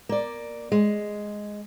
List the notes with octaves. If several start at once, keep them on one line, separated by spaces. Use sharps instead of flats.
A#3 D5
G#3